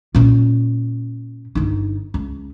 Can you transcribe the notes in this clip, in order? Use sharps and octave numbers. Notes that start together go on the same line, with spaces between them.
A#2 C#4
G1 D#4
C#2